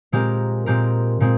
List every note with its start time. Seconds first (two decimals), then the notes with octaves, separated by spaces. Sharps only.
0.12 A#2 G#3 C4 G4 A#4
0.66 A#2 G#3 C4 G4 A#4
1.20 A#2 G#3 C4